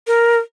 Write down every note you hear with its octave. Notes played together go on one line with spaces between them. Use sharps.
A#4